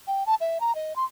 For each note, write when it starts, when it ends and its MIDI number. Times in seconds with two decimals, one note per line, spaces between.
0.07 0.24 79
0.26 0.35 81
0.41 0.59 76
0.61 0.75 82
0.75 0.96 75
0.96 1.04 84